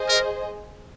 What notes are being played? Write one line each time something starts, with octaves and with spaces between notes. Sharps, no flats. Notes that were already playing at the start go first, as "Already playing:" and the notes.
Already playing: G#4 C5 D#5
A#4